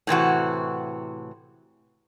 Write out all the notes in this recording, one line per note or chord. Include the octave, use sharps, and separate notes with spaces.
A2 C3 E3 F#4